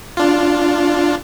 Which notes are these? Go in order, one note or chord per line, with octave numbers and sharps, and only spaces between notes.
D4 F4